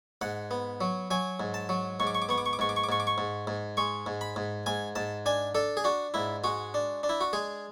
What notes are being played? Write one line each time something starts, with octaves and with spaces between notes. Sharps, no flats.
G#2 F#5
B3
F#3
F#3 G#5
G#2
A5
F#3
G#2 C#6
D6
C#6
D6
B3 C#6
D6
C#6
D6
G#2 C#6
D6
C#6
D6
G#2 C#6
D6
C#6
G#2
G#2
G#3 C#6
G#2
B5
G#2
G#2 G#5
G#2 A5
D4 G#5
D4 A4
G#4
D4 F#4
G#2 E4
G#3 F#4
D4
D4
E4
F#4
G#3 G#4